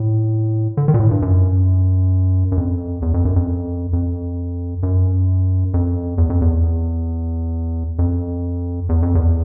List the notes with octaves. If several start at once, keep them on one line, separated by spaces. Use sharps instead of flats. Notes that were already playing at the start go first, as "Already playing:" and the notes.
Already playing: A2
D3
D#3
A#2
A2
G2
F#2
F#2
F2
E2
F2
F#2
F2
F2
F#2
F2
E2
F2
E2
F2
E2
F2
E2